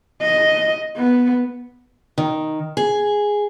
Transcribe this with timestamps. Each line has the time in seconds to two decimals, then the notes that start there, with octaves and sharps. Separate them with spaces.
0.22 D#5
0.97 B3
2.18 D#3
2.77 G#4